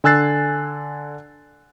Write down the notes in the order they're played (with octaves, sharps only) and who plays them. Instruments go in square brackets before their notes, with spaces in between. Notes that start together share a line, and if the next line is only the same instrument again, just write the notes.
[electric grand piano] D3 G#5 E6 F#6 A6 C7